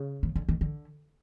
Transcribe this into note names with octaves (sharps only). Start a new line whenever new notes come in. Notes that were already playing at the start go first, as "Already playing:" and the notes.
Already playing: C#3
D#3
D3
D#3
D3